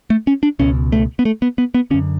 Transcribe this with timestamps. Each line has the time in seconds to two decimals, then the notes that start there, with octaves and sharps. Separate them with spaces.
0.10 A3
0.27 C#4
0.43 D4
0.59 C#2 B2 C#4
0.92 A3
1.19 B3
1.25 A3
1.42 B3
1.58 B3
1.74 B3
1.91 D3 C#4
1.94 F#2